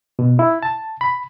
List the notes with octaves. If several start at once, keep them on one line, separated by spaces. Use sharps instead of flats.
B2
E4
A5
B5